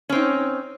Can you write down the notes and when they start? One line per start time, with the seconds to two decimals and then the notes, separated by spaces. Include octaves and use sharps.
0.09 C#4
0.12 C4
0.15 D#4